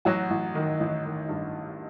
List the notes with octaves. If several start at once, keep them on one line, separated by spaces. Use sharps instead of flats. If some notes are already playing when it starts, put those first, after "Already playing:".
A1 F#3 F#4
A1
D#3
A1
D#3
G2